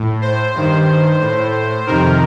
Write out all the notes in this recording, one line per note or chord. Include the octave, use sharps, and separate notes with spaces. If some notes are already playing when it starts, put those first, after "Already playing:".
Already playing: A2
C5
G2 D#3
A2
F2 C3 D#3 A#4